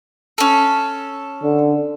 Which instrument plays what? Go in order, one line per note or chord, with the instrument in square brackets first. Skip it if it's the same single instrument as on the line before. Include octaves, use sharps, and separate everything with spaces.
[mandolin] C#4 A4
[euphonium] D3